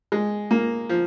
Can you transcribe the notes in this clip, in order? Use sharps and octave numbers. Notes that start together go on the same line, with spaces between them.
G#3
A#3
F3